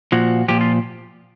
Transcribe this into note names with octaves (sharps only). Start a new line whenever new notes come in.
A#2 F3 F#4
A#2 F3 G4
F4